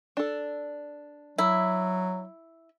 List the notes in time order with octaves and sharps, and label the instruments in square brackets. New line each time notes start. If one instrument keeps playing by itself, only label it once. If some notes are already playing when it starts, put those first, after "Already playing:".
[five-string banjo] D4 A4
[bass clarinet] F#3 [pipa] E4